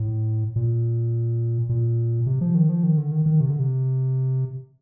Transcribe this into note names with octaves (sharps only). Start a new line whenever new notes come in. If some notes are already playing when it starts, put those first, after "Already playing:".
Already playing: A2
A#2
A#2
C3
F3
D#3
F3
D#3
D3
D#3
D#3
C3
D3
C3